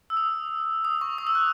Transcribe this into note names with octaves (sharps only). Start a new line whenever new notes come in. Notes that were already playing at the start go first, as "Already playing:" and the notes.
E6
D#6
D#6
C#6
D#6
E6
F#6